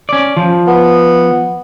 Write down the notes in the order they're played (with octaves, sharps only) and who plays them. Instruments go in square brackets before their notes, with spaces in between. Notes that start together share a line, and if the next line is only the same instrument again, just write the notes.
[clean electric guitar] C#4 D5
F3
[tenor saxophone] B3